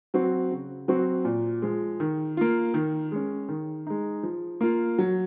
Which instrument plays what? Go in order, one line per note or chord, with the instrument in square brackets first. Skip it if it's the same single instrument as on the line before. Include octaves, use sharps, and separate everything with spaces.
[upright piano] F#3 C4 F#4
C#3
F#3 C4 F#4
A#2
F3 G#3
D#3
A#3 F4
D#3
G#3 C#4
D#3
G#3 D#4
F3
A#3 F4
F#3